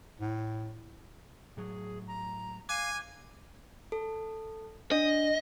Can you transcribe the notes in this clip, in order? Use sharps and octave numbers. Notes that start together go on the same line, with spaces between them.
A2
A2 F#3 G#4
A#5
F5 G#5 D6 F#6 D#7
A4
D4 D#5